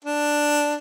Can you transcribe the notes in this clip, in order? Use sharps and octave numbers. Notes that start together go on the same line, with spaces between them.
D4